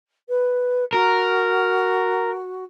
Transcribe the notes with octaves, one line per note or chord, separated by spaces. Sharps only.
B4
F#4 A#4